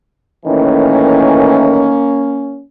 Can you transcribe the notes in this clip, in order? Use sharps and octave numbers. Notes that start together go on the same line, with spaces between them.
A2 D#3 E3 A#3 C#4